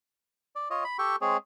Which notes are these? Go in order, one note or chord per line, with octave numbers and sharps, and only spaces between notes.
D5
F4 C#5 D#5
B5
G4 A4 G5 C#6
G#3 C4 G#4 C#5